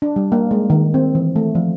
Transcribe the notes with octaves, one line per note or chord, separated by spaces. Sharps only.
D4
G3
A#3
G#3
D#3
C4
E3
A3
F3